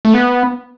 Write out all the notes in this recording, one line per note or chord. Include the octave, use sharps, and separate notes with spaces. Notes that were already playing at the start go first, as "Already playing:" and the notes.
A3
B3